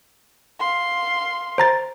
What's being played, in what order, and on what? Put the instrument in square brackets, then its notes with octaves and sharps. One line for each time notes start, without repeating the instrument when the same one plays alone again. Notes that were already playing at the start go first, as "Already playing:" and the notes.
[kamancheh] F5 C6
[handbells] C5 A#5 A6